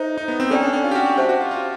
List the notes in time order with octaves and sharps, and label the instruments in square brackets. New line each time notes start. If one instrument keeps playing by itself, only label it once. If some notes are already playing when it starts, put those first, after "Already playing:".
Already playing: [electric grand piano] D#4 [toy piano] A4 C5 E5
[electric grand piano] D#4
B3
C4
[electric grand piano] C#4 [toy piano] A4 D5 G5
[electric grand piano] D4
C#4
F4
G4
F#4
F#4
[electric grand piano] G4 [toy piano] C5 E5 A5
[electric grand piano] F#4
F4
F4